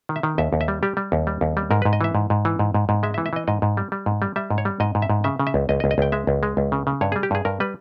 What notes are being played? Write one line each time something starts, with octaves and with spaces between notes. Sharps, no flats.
D#3
E5
D#3
D#2 E5
D#2
E5
G3
G3 G4
G3
D#2
G3
D#2
G3
G#2 A#4
G#2 B4
D#5
E3 E5
G#2
G#2
E3
G#2
G#2
G#2
G#3 E5
E5
E3
E5
E3 D#5
G#2 D#5
G#2
G3
G3
G#2
G3
G3 E5
G#2
C#5
G3
G#2 D#5
G#2
E5
G#2
C#3 E5
C#3
E5
C#2
C#2 D#5
D#5
C#2
D#5
C#2 G5
G#3 E5
C#2
G#3
C#2
C#3
C#3
G2 C#5
G3 G#4
G4
G2 G#4
G2 A#4
G3 B4